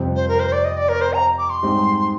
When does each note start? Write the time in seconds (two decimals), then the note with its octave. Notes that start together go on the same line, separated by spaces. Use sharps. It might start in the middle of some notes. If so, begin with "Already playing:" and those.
Already playing: F2 C3 G3 C4
0.15 C5
0.28 A#4
0.40 C5
0.52 D5
0.65 D#5
0.77 D5
0.89 A#4
1.01 C5
1.13 A#5
1.38 D6
1.50 C6
1.63 G#2 G3 C4 D#4 G4